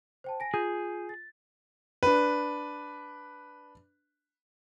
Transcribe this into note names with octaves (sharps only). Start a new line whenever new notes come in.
C5 G5 A5
G#5 A#6 D7
F4 G#4 G6 D#7
A6
D4 B4